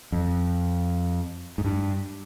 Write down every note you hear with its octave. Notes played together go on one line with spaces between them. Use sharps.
F2
G#2
G2